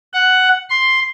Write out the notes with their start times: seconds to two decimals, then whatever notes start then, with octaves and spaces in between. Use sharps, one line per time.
0.13 F#5
0.70 C6